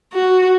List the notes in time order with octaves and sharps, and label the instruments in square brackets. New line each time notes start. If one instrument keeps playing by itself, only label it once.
[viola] F#4